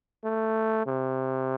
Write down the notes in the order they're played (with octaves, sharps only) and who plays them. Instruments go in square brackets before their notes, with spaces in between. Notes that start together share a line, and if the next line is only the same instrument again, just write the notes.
[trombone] A3
C3